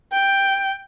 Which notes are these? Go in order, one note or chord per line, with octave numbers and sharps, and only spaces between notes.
G5